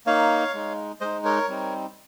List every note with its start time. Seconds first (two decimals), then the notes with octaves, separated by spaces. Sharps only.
0.06 A#3 D#4 C#5 F5
0.54 G#3 D#4
1.01 G#3 D#4 C5 D#5
1.24 A#4 C#5
1.48 G3 C4 D#4